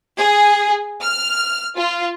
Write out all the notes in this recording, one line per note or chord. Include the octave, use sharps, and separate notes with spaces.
G#4
F6
F4